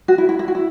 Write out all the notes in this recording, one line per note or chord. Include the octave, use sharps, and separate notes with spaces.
F#4
E4
E4
E4
F#4
E4